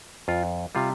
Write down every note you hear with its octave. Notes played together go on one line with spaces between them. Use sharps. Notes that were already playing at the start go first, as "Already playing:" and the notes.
F2 F4
C3 G3 F4